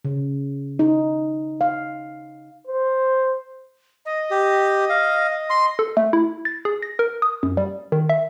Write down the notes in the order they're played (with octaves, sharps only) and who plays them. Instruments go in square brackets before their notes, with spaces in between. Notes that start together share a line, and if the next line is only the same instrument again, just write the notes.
[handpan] C#3
D#4
F5
[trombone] C5
[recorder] D#5
[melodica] G4
F5
C6
[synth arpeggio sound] A4
A3
E4
A6
G#4
A#6
A#4
D#6
F#2
G3
D#3
E5